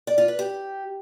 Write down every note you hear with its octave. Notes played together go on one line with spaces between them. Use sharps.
D5
F4
B4
G4